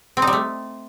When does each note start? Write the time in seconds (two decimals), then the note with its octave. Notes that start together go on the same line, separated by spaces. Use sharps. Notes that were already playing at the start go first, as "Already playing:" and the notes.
0.17 C4
0.22 D#4
0.27 G3
0.33 A3